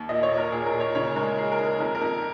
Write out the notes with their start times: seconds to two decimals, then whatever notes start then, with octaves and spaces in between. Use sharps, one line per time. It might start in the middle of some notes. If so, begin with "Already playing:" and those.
Already playing: D#2
0.09 A#2 D#5
0.23 C#5
0.31 A#2
0.37 A#4
0.52 A#2 G#4
0.66 A#4
0.73 A#2
0.80 C#5
0.95 C#3 C#5
1.16 G#3 A#4
1.37 D#4 G#4
1.52 A#4
1.59 D#4
1.66 A#4
1.80 F2 A#4
1.95 A#4
2.01 F2